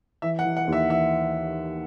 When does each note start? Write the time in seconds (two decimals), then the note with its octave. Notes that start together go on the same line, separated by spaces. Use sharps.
0.22 E3 E5
0.39 F#5
0.45 E3
0.57 F#5
0.68 D#2
0.73 E5
0.90 E3 E5